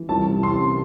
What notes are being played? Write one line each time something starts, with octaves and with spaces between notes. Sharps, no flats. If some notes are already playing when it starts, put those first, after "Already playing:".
Already playing: E3
C2 A5
C3
G3 C6
C3